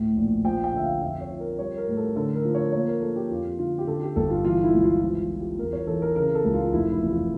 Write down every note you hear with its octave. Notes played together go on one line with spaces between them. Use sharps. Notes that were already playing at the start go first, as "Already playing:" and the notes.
Already playing: D2 A2
A#1
F3 G5
G5
D3 E5
F5
F2 E5
C#5
F3
A#4
G3 C#5
A#4
A2
A4
D3 A4
A#4
F3
C#5
A#3 C#5
A#4
F3 A4
G4
F2 F4
D3 F4
G4
D3 A4
G4
G1 A4
F4
E3 F4
E4
C#2
F4
F3 F4
F4
F3
G4
E2 A#4
C#5
E3 A4
A#4
C#3 A#4
A4
C#2
F4
F1 E4
E4
E2
F4